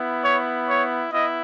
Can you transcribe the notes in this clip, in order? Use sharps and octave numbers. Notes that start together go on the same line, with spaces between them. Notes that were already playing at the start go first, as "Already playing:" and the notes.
Already playing: B3 E4
C#5
C#5
B3 E4 D#5